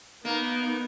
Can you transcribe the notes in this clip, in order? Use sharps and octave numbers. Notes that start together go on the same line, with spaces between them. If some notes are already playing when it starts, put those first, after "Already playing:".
A#3 B3 D#4